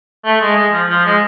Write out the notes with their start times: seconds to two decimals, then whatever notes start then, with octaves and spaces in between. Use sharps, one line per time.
0.25 A3
0.41 G#3
0.56 G#3
0.73 F3
0.90 F3
1.05 G#3